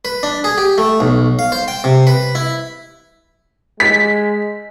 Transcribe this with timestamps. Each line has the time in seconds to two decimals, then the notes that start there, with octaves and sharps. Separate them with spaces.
0.05 B4
0.23 D4
0.44 G#4
0.58 G4
0.78 A3
1.00 B1
1.39 F5
1.52 C5
1.68 G5
1.84 C3
2.07 B4
2.35 E4
3.80 G#3 B6